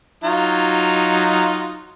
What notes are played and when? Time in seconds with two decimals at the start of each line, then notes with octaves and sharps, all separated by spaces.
0.24 F#3 D#4 F4